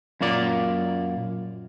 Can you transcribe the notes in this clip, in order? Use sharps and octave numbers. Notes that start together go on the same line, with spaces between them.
F#2 A#2 A#3 D5